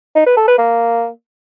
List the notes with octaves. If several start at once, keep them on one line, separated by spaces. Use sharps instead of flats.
D#4
B4
A4
B4
A#3